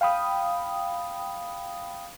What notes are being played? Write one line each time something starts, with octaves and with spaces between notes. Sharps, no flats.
F5 G5 B5 D#6